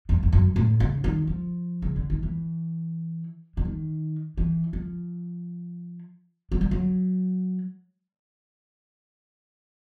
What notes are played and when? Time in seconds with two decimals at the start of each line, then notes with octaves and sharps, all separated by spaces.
0.09 F2
0.23 F2
0.32 F#2
0.56 A2
0.80 C#3
1.04 D#3
1.27 F3
1.82 C#3
1.96 D3
2.10 D#3
2.23 E3
3.57 D3
3.65 D#3
4.38 E3
4.73 F3
6.52 F#3
6.61 G3
6.71 F#3